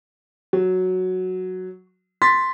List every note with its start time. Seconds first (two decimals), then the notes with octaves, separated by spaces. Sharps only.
0.53 F#3
2.22 C6 A6 B6